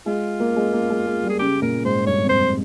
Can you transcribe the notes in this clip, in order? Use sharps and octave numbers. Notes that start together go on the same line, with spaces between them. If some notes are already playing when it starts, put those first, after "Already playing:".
G#3 F4
A#3
G#3
A#3
G#3
G#3
G3
G#4
C#3 G4
A#2 A#4
G#2 C5
G2 C#5
F2
C5